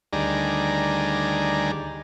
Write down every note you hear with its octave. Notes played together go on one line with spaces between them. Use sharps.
D2 D#3 G3 G#4 D5 A#5